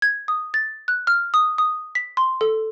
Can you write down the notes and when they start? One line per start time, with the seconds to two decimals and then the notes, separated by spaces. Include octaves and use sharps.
0.02 G#6
0.28 D#6
0.54 A6
0.88 F#6
1.07 F6
1.34 D#6
1.58 D#6
1.95 B6
2.17 C6
2.41 A4